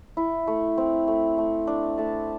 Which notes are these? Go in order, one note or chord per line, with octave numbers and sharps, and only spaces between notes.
E4
A3
C4
A3
A3
D4
A3 A5